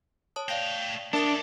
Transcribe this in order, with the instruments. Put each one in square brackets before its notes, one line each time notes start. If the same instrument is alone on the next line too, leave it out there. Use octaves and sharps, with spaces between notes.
[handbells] C#5 A5 D#6
[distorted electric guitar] A3 G5 [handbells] D5 F5 A#6
[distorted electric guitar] C#2 A4 [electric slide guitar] D4 [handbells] A#4 E5 D#6